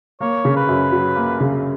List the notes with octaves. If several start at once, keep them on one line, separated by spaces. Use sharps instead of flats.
A#3 C#5
C#3
B4
F#2
F#3
A#3
C#3